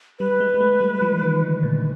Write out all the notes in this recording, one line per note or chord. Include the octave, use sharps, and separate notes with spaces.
G3 B4
G#3
G#3
A3
G3
F3
E3
D#3
D3
A#2